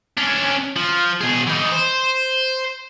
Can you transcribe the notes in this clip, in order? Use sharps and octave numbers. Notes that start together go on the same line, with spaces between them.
C#4 D4
F3
B2 G#4
E3 D#4
C5